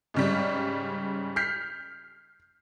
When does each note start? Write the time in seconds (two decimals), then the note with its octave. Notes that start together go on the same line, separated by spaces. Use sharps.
0.14 G#2 C#3 G3
1.36 F6 G6 B6 C7